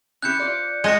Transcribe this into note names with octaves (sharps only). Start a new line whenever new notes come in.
C#4 E4 G4 F#6 G6 C#7
F4 C5 D5
F3 G#3 F#4 G5 F#6 A#6 C#7